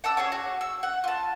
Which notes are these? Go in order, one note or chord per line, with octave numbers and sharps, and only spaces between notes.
F#5 A5 D6 E6
C#4 G#4 C#5
F#4
E6
F#5
F4 A5